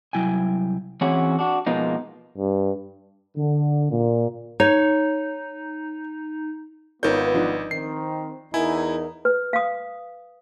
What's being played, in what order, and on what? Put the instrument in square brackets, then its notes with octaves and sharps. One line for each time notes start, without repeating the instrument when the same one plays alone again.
[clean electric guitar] C2 F#3 E4 G5 G#5
[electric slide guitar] E3 C4 C#4 F#4 G#4 C#5
D4 F#4
B2 F3 G#3 A#3 B3 D#4
[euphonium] G2
[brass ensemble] D3
A#2
[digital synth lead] D#4 [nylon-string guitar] C#5
[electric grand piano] G#1 G6 [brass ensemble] B3 F4 B4 [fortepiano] D#4 A#4 C#5
[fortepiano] F3 D4 D#4
[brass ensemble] D#3 C4 [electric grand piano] C7
[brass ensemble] E2 D#4 A#4 [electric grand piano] E4 G#5
[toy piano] B4
F5 D#6